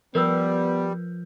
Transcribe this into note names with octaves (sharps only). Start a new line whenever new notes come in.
F3 G3 B3 A#4 B4 E6